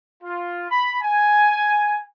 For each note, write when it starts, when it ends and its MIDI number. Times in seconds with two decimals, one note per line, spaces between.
0.23 0.65 65
0.69 0.97 83
1.02 2.04 80